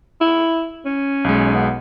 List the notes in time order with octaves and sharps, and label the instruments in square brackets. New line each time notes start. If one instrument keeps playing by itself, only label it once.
[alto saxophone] E4
C#4
[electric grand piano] B1 G#3
[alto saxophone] B3